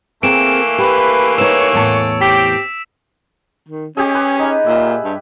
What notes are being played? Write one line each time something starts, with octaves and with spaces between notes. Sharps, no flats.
E3 A3 A#3 C4 G#4 A#4 D7 E7
G4 B4
D#4 B4 C#5 E6 E7
E2 A2 A5
C4 G4 B6
D#3
C#4 G4 G#4
B4
D#4
A#2 E5
G2